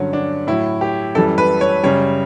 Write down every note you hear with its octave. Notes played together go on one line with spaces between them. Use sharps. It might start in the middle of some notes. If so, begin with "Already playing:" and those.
Already playing: G2 D3 F#3 C#4
D4
A2 F#3 E4
G4
F#2 E3 G3 A4
B4
C#5
F#2 C#3 G3 C#5